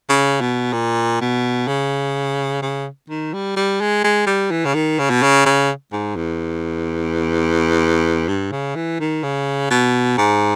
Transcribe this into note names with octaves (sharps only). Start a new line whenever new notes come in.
C#3
B2
A#2
B2
C#3
C#3
D#3
G3
G3
G#3
G#3
G3
E3
C#3
D#3
C#3
B2
C#3
C#3
G#2
E2
G2
C#3
E3
D#3
C#3
B2
G#2